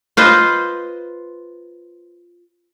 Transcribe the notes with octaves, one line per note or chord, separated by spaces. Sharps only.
F4 B4 C5 D#5